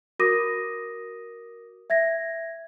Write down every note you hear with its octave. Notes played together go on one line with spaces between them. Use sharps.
F#4 A#4 D6 D#6 A#6 D#7
E5 G#6 A#6